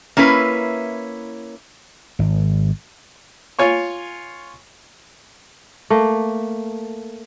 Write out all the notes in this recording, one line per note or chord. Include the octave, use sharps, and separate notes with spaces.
A#3 C#4 E4 B4
G#1
F4 C#5 G#5 C#6
A3 A#3